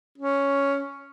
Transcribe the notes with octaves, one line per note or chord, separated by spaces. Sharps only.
C#4